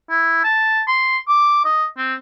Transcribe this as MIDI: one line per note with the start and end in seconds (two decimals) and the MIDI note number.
0.10 0.41 64
0.44 0.81 81
0.88 1.18 84
1.28 1.60 86
1.65 1.86 75
1.97 2.14 60